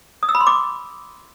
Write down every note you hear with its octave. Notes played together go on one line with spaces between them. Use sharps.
D#6
E6
B5
C6
D6